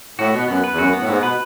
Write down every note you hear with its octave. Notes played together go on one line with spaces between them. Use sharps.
A2 F#4
B2 B3
F#2 B3
B4
E2
F#2 F#4
B3
A2
G#2 B3
B2 B4